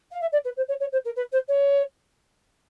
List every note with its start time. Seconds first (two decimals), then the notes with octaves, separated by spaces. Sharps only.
0.11 F5
0.20 E5
0.32 D5
0.44 B4
0.56 C5
0.68 C#5
0.80 C#5
0.92 C5
1.04 A#4
1.15 B4
1.32 C5
1.48 C#5